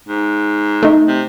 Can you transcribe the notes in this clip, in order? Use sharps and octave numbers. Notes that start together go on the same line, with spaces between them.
G#2
A3 D#4
C3